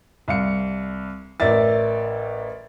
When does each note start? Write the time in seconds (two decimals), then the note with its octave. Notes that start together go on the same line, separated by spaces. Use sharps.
0.28 C2 F5 C#7
1.40 A1 A#4 D5 E5 A6